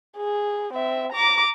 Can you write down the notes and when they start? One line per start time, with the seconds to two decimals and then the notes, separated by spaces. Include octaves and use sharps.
0.18 G#4
0.73 C4 E5
1.12 A#5 D6